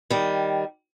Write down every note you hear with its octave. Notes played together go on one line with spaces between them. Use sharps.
D#3 G3